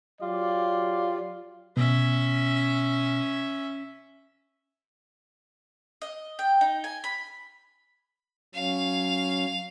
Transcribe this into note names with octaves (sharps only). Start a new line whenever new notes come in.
F#3 F4 G4 D5
B2 C#4 E5
D#5
G5
D#4
G#5
B5
F#3 C#4 F5